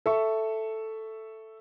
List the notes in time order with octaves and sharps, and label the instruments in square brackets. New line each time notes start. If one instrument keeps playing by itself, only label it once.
[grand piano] A4 E5 C#6